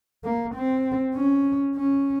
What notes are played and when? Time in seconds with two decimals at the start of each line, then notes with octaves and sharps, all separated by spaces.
0.24 A#3
0.55 C4
1.15 C#4
1.76 C#4